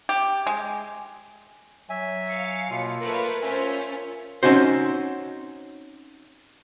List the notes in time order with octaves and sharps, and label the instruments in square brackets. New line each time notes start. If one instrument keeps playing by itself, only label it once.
[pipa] G4
G#3
[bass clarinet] F#3 [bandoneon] E5 G#5
[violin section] F5 C7 C#7
[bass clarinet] B2 [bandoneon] A#3 F4
[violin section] A3 B4 C#5 [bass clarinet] A#4
[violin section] C#4 F4 C5 [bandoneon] E5 G#5
[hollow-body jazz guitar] C4 C#4 D#4 F#4 C5